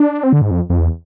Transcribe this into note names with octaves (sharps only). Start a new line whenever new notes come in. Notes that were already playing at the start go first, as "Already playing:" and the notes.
Already playing: D4
C4
D3
G#2
F2
F2
E2